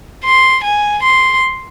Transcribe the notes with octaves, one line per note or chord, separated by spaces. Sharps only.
C6
G#5
C6